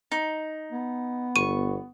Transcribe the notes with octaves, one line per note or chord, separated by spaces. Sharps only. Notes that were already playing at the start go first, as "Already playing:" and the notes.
D#4
B3
G1 C#6 D#7